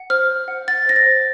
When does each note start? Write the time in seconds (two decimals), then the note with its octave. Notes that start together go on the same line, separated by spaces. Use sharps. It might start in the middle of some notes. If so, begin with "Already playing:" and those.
Already playing: F#5
0.10 C5 F6
0.29 C5
0.48 F#5
0.68 F#5 A6
0.86 C5 A#6
0.96 A6
1.06 C5